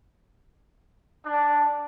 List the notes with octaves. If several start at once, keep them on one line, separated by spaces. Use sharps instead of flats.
D4